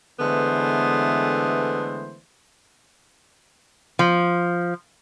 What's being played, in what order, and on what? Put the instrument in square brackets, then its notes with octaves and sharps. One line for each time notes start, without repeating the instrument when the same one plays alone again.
[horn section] D3 E3 G#3 A3 B3 C5
[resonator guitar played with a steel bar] F3